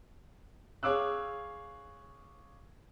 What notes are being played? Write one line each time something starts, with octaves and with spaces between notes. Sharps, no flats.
G#4 C#5 F5 D6 E6 F#6